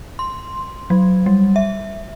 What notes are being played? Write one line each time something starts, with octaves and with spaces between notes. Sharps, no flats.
C6
F#3
G3
E5